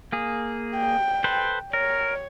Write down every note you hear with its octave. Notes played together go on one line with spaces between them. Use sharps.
A#3 G#4
G5
A4 B4 C5
A#4 C#5